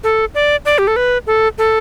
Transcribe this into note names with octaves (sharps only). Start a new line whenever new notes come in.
A4
D5
D5
G4
A4
B4
A4
A4